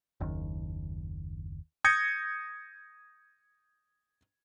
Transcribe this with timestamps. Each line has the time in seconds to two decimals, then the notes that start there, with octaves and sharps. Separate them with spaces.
0.21 F#1 D#2
1.84 D#6 G6 G#6 A#6 C#7